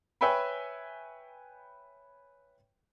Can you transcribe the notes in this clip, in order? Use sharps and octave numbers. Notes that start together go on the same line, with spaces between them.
B4 C#5 E5 G5 G#5 B5